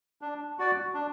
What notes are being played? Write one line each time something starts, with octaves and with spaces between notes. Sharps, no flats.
D4
F#4 D5
D4